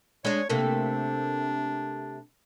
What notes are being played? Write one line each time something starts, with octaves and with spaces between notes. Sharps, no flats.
G#3 D4 C#5
C3 A3 A#3 D4